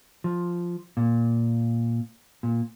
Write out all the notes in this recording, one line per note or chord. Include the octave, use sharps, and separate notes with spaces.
F3
A#2
A#2